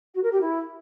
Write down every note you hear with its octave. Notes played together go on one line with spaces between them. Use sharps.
F#4
A#4
G4
E4